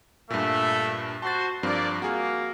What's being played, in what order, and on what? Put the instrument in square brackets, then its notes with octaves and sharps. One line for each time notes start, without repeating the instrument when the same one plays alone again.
[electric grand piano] G2 A#2 [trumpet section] A3 E5
[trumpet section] F#4 C5 C6 [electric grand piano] A5 A6
[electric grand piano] G2 F3 C4 [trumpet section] A#3 D5
[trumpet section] A#3 [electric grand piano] F#4 G#4